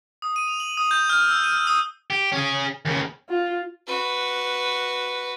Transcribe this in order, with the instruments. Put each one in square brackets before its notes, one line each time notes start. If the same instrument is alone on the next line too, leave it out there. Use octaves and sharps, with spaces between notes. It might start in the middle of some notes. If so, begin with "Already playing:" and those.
[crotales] D#6
D#7
F7
F#7
D#6
G6
F6
E6
D#7
F6
D#6
[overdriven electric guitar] G4
C#4 G#4
D#2 C#3
[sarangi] F4
[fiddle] F#4 B4